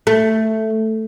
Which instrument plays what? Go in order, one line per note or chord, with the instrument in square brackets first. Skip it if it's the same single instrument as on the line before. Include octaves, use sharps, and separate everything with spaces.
[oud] A3